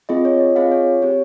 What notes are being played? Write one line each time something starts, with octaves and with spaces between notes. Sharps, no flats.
C4 F4 G#4 D#5
C#5
D#5
C4 F4 G#4 F5
C#5
C4 G4 C#5